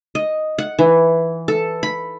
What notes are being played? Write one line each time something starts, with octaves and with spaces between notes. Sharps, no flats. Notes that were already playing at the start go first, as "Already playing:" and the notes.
D#5
F#5
E3
A4
B5